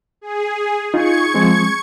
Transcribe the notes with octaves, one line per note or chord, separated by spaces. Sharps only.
G#4
D#4 F4 C#6 G#6 C#7
F3 G#3 C4